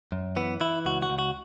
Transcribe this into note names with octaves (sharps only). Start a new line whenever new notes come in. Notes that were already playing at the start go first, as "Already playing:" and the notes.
F#2
E3 B3
E3 E4
C#2 F#4
F#4
C#2
F#4